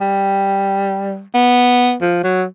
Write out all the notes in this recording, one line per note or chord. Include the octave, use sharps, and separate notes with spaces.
G3
B3
F3
F#3